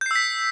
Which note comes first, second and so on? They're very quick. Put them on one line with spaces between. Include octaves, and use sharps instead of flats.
G6 C7 E6 B6